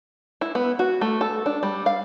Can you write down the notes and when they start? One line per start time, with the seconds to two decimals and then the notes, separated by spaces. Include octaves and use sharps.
0.41 E4
0.55 B3
0.79 F#4
1.01 A3
1.21 A4
1.46 D4
1.63 G3
1.86 F5